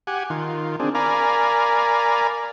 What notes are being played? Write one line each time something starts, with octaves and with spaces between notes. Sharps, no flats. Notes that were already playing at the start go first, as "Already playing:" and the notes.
G4 F#5 G#5
D#3 F4
C4 D4 G#4
A#4 D5 F5 G#5 A#5 B5